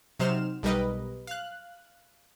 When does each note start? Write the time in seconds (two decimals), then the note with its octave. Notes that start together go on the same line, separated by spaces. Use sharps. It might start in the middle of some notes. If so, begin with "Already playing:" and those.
0.20 C3 F#3 D#4 C5 F6 E7
0.63 B1 G3 A#4 B4 D#5
1.27 F5 F#6